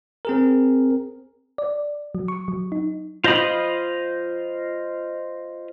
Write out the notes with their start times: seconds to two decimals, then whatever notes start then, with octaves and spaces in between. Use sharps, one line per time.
0.25 C4 G#4 A#4
1.58 D5
2.15 F#3
2.28 C#6
2.48 F#3
2.72 D#4
3.24 F4 C5 D#5 B5 D#6